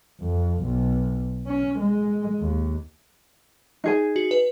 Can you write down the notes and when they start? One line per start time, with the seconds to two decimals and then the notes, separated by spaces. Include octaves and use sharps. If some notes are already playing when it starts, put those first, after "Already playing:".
0.21 F2
0.63 B1
1.47 C#4
1.79 G#3
2.39 D#2
3.84 D#4 G#4 G#5
4.16 F#4
4.31 B4